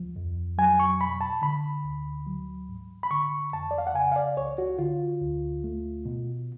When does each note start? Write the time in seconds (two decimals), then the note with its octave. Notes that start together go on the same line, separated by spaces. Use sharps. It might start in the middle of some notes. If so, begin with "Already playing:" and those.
Already playing: D2 F3
0.16 F2
0.58 F#3 G#5
0.80 C#6
1.01 B2 B5
1.21 A5
1.42 D3 B5
1.84 D2
2.27 F#3
2.69 G#2
3.03 B5
3.10 D3 C#6
3.53 F2 A5
3.71 D5
3.78 F5
3.87 F#5
3.94 C#3 G#5
4.12 F5
4.16 D5
4.37 C#2 C#5
4.58 F#4
4.78 D3 F4
5.21 D2
5.64 A3
6.06 B2